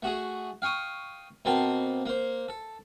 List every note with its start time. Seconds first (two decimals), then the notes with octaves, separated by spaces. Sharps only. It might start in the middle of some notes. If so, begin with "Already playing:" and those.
0.02 A3 F#4 G#4
0.62 F5 G5 C#6 D#6
1.45 B2 A#3 C4 A5 C6
2.06 A#3 C5
2.48 A4